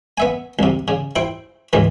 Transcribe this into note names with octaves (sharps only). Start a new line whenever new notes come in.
B3 E5 G#5
C2 C3
C#3
E4 C5 G5
C#2 G#2 D#3 E3